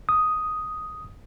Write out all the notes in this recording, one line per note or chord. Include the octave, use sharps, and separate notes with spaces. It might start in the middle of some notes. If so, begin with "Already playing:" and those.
D#6